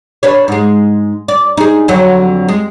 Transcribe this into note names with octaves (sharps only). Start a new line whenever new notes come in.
D4 B4 C#5
G#2 G#3
D5
D#4 G#4
F2 D3 F#3
G#3